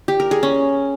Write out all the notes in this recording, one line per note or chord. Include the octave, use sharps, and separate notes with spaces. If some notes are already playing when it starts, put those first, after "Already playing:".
G4
A#4
G#4
C#4